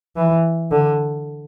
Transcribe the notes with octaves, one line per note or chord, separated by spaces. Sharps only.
E3
D3